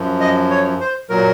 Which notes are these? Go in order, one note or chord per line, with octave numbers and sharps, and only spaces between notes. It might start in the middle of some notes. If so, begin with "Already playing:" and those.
Already playing: F#2 F3
D#5
C#5
C5
A#2 F#3 A#4